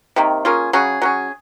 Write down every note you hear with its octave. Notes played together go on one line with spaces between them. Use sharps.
C3 D#3 A#3
A#3 C#4 F4 G#4
C#3 F#3 C#4 G#4
F#3 C#4 G#4